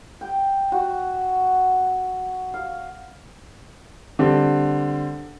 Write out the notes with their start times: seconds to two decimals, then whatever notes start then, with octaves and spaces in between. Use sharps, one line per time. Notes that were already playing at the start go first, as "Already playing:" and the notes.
0.21 G5
0.72 F#4
2.54 F5
4.19 D3 G3 C4